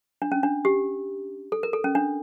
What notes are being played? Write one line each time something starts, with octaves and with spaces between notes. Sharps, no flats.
D4
C#4
D4
G4
A4
A#4
A4
C#4
D4